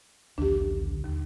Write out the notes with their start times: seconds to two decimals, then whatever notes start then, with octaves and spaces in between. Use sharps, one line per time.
0.38 A#1 D#2 D3 D4 G4
1.04 D#2